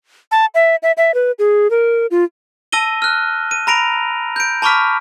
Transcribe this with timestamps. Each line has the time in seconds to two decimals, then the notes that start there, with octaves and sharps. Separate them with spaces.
0.31 A5
0.55 E5
0.83 E5
0.97 E5
1.14 B4
1.39 G#4
1.70 A#4
2.11 F4
2.72 A5 E6 A#6 D#7 G7
3.02 F6 F#6
3.51 D#7
3.67 A#5 B5 A#6 D7 F7
4.36 G6 D7
4.62 A5 B5 C#6 D6 F6 B6